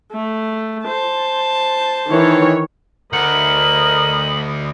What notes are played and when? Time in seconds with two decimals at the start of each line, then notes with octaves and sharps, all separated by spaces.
0.12 A3
0.84 C5 A5
2.10 D#3 E3 C#5
3.13 D2 A#4 D#5 F#5 B5 F#7